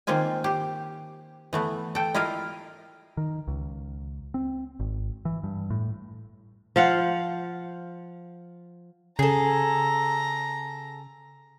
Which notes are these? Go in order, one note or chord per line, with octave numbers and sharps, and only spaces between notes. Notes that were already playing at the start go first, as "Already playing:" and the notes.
D#3 A#3 C4 F4 G#5
G4
E3 A3 B3
A4 G5
E4 F4 A#4 D#5 F5
D#3
C#2
C4
G#1
E3
G2
A2
F3 F5 F#5
C#3 G#4 A4 A#5